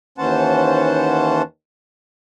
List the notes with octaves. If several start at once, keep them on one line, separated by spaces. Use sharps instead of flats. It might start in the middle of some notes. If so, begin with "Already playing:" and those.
D#2 E3 C#4 C5 F#5 A5